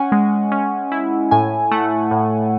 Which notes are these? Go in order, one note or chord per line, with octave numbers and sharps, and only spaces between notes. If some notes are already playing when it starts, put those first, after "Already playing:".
Already playing: C#4 F#5 G#5
G#3
C#4
E4
A2 G#5
A3 F#5
A2